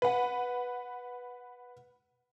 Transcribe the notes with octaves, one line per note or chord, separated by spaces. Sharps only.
B4 F#5